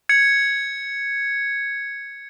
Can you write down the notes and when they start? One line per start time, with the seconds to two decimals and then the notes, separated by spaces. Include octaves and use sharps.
0.09 G#6 C#7